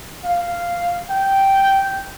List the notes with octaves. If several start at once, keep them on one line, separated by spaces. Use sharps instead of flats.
F5
G5